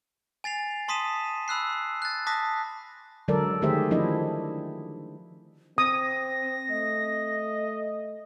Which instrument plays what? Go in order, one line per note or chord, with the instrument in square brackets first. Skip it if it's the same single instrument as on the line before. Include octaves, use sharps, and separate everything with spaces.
[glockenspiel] G#5 A6 C7 F7
A5 C6 D#6 B6 D#7 E7
B5 E6 F#6 C7
F#6 A6
A5 D6 D#6 F#6 A#6 B6
[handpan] D3 F#3 G#3 A4 A#4 D5
D#3 A3 G4 G#4 C5 E5
F3 D4 E4 D#5
[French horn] C4 [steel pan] D#6 [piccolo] A#6
[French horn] A3 [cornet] D#5